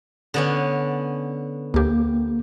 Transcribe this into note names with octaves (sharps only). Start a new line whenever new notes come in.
D3 B3 C#4
D2 A#3 G4